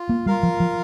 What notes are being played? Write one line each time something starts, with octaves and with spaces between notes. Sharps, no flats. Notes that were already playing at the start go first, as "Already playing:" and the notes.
Already playing: F4
A#3
G3 F4 A#4 F5
F3
F3